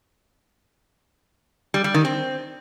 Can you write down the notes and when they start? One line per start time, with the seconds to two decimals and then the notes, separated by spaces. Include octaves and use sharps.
1.74 G3
1.84 G3
1.94 D#3
2.05 C4